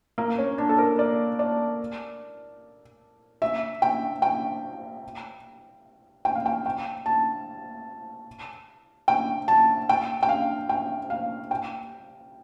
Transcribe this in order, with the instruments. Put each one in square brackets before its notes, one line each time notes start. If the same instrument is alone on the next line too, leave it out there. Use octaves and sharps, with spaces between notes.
[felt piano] A#3
C#4
D4
A4
A#4
D5
D5
E5
G5
G5
G5
F5
G5
G5
A5
G5
A5
G5
G5
F5
G5
F5
G5